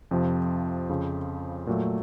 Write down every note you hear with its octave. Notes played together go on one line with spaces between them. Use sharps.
F2 C3 F3
F2 C#3 F3
A#2 F#3 A3